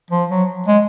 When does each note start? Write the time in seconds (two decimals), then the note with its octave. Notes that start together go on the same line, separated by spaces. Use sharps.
0.11 F3
0.30 F#3
0.68 G#3